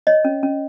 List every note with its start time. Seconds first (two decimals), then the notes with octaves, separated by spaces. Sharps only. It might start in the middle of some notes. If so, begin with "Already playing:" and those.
0.07 C#5 D#5
0.25 C#4
0.43 C#4